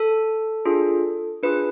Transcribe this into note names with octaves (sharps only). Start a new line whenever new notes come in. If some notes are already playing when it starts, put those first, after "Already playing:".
Already playing: A4
D4 F4 G#4
D4 F4 G#4 B4